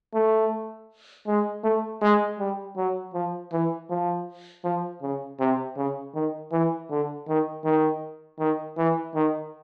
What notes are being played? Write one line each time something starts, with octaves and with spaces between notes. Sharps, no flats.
A3
G#3
A3
G#3
G3
F#3
F3
E3
F3
F3
C#3
C3
C#3
D#3
E3
D3
D#3
D#3
D#3
E3
D#3